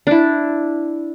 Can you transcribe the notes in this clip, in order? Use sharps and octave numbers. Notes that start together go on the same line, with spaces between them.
D4 E4